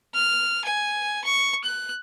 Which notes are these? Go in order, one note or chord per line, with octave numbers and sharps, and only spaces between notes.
F6
G#5
C#6
F#6